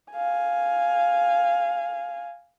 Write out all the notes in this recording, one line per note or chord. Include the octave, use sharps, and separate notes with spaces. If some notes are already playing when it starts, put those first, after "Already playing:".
F5 G#5